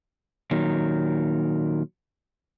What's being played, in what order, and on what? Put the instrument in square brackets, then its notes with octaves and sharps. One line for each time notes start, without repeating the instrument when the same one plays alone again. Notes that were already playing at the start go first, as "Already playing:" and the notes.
[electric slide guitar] A#2 D#3 F#3